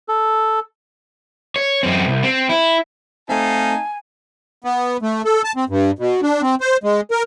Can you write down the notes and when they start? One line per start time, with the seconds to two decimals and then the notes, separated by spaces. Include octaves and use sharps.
0.09 A4
1.56 C#5
1.83 F#2 C4
2.08 C2
2.23 C4
2.49 E4
3.29 A3 C4 D#4 F5 G#5 A5
4.64 B3
5.02 A3
5.25 A4
5.44 A5
5.56 C4
5.69 G2
5.99 B2
6.23 D4
6.42 C4
6.61 C5
6.84 G#3
7.11 A#4